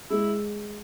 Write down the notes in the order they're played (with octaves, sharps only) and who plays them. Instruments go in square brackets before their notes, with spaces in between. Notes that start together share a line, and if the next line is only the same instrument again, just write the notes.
[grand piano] G#3 [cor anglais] E4